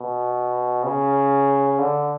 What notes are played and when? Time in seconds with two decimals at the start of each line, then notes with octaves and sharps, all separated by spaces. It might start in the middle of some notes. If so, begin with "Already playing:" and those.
Already playing: B2
0.84 C#3
1.79 D3